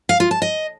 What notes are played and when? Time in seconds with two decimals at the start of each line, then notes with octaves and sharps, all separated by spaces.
0.09 F5
0.20 F4
0.31 A5
0.42 D#5